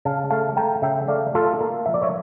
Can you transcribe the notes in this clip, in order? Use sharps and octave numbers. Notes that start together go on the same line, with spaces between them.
C#3 F5 A5
A3 F5 A5
A3 G5 A#5
C#3 E5 G5
A3 D5 F5
A3 F4 A4
A#3
F3 E5
D5
C#5 E5